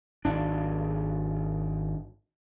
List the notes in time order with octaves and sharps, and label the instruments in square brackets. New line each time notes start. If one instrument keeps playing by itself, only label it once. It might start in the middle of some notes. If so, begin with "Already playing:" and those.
[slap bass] G#1 D4